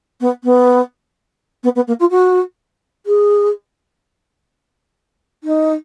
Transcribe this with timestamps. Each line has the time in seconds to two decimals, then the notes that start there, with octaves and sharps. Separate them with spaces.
0.20 B3
0.44 B3
1.63 B3
1.75 B3
1.87 A#3
1.99 F4
2.10 F#4
3.06 G#4
5.44 D#4